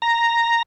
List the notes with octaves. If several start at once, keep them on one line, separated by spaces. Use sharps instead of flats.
A#5